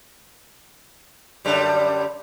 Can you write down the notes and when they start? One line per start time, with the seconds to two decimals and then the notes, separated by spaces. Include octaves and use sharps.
1.45 F#2 D3 G3